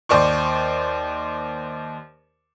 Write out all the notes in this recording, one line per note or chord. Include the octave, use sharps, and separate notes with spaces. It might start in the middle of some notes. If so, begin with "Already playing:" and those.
D#2 C5 D5 C#6